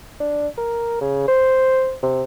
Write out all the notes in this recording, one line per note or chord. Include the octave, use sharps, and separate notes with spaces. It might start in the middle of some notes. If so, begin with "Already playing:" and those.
D4
A#4
C#3
C5
C3